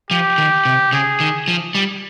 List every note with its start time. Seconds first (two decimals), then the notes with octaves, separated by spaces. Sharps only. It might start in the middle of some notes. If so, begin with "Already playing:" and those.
0.11 F3 G4
0.38 D#3
0.65 C3
0.93 C#3 G#4
1.20 D#3
1.48 F3
1.75 G3